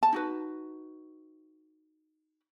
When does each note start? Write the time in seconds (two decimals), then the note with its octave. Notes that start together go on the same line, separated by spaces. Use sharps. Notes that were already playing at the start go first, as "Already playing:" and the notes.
0.03 A5
0.13 D#4 F#4 B4